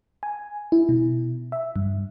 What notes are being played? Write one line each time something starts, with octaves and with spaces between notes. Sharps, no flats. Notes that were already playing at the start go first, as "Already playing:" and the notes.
G#5
E4
B2
E5
G2